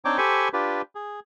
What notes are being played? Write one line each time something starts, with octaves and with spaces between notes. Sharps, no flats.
C4 D4 D#4 C#5 G5 D6
G4 A4 C5 G#5 B5 C#6
D4 F4 G4 B4
G#4